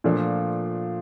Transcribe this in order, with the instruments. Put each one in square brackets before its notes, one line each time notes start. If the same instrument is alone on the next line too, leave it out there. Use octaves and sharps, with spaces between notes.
[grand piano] A#2 F3 A3 D4